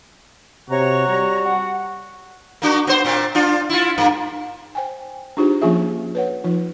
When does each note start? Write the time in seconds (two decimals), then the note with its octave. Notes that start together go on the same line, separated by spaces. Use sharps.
0.70 C3 F#4 C#5 A#5
1.09 G3
1.45 F#5
2.62 A#3 D4 F#4
2.87 B3 C5
3.05 A#2 C4
3.35 D4 F4
3.70 E4 F4
3.98 G2 A#3
4.75 C5 G5 G#5
5.37 D4 D#4 F4 G4 G#4 C5
5.62 F3 A#3 C#4 F4 G#4 E5
6.15 B4 C#5 F#5
6.44 F3 D#4 F4